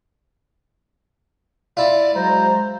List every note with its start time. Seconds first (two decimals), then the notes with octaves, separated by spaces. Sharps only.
1.77 E4 F4 D5
2.15 F#3 G#3 C5 A#5